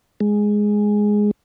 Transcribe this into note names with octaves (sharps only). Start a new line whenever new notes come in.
G#3